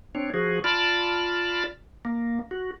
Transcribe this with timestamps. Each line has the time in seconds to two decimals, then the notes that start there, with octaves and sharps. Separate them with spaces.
0.15 C4 D4 C#5
0.34 F3 F#4 G#4
0.64 F4 D5 A5 B5 F6
2.05 A#3
2.51 F#4